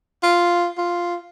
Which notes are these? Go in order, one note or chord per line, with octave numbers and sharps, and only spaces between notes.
F4
F4